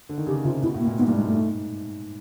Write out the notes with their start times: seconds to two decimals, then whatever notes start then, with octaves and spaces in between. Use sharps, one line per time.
0.09 D3
0.18 D#3
0.27 C#3 G4
0.44 C3 F4
0.62 B2 E4
0.74 A2
0.80 A#3
0.87 A#2
0.98 G#2 B3
1.07 G2 A#3
1.16 G#2 G#3
1.25 A3
1.34 G#2